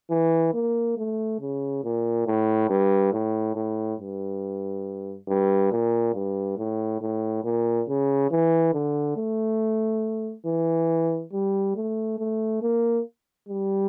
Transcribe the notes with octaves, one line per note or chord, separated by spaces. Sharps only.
E3
A#3
A3
C#3
A#2
A2
G2
A2
A2
G2
G2
A#2
G2
A2
A2
A#2
C#3
E3
D3
A3
E3
G3
A3
A3
A#3
G3